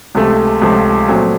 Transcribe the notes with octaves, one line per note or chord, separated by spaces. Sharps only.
C#2 C3 F3 A3
C#2 C3 F3 A3
A#2 F#3 A3 C4